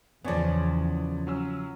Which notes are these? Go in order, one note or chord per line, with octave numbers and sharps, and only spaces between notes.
E2 C#3 F3 B3 C#5 D5
F#3 C#4 E6